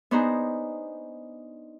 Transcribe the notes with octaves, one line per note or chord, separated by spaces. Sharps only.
B3 D4 D#4 G#4 C5 A#5